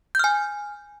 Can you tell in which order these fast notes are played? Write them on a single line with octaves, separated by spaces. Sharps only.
G6 F6 G#5